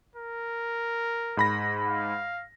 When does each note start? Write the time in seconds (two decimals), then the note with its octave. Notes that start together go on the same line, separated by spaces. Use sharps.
0.16 A#4
1.37 G#2 B5 A#6
1.88 F5